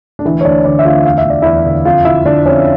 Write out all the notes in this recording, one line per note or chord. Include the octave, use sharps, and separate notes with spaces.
D4
D2 E3 E4
C#5
D2 D4 D5
D3 D4 D5
E5
D2 F4 F5
E2 F5
E5
D3 D5
E2 E4 E5
D3
F2 F4 F5
D3 E4 E5
D3 D4 D5
F2 C#4 C#5